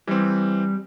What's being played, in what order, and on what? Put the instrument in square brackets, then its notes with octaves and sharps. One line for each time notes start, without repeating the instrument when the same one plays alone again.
[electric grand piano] E3 C4 [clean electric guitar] G3